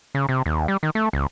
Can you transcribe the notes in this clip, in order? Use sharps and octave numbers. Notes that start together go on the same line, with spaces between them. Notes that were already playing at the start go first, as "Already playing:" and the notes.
C#3
C3
D#2
G3
D#3
A3
C#2